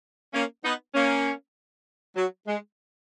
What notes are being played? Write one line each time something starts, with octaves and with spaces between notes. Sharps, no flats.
A#3 C#4
B3 D#4
A#3 C#4
F#3
G#3